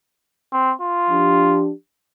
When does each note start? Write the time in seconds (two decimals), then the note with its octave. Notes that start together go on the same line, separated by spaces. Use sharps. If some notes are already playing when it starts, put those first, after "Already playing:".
0.53 C4
0.81 F4
1.10 F3 D4 G4